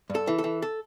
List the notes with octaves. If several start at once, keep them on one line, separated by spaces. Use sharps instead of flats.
G2
A4
E3
A4
E3
A4